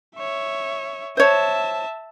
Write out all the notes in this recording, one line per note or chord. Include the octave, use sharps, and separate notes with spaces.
C#5 E5
C5 C#5 E5 A5